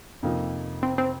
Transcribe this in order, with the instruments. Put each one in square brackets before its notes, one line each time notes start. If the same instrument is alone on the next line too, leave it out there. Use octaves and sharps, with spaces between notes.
[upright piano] F2 C3 F3 A#3 D#4
[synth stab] C4
C4